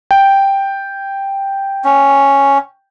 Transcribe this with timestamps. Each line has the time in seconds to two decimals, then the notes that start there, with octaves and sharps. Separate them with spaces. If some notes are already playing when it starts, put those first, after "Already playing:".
0.11 G5
1.85 C#4